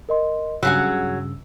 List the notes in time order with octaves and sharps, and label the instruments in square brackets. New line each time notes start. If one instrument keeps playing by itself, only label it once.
[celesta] A#4 D#5 C6
[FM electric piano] G2 C#3 [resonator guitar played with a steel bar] F#3 G#4 F#5 [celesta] E6